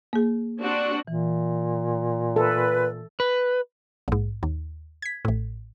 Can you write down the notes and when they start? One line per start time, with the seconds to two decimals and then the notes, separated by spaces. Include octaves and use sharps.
0.13 A#3 G#4
0.61 C4 D4 F#4
1.07 A#2 E3
2.36 A4 B4
3.20 B4
4.08 A#1 G#2
4.43 D#2
5.02 G#6 B6
5.25 A1 A2